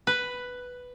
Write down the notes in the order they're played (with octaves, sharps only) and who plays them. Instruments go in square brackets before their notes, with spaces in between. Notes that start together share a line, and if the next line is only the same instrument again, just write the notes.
[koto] B4